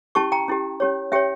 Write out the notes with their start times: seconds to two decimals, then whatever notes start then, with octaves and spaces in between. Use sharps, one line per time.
0.15 C#4 E4 G4 A5 C#6
0.32 G5 A#5
0.48 C#4 E4 G4
0.80 C#4 G4 C#5
1.12 C#4 G4 C#5 E5 G5